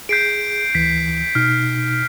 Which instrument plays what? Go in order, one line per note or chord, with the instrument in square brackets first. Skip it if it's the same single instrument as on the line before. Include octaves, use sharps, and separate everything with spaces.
[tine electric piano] G#4 B6 [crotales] G6 C7 D7
[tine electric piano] D2 E3 [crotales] B6
[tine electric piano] B2 D#4 [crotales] F6